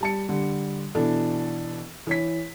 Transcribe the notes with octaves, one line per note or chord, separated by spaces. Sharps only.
G3 A5 C#7
D3 G3
B2 E3 D4 A4
E3 C#5 B6